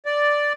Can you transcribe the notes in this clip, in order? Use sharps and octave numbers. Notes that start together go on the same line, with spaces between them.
D5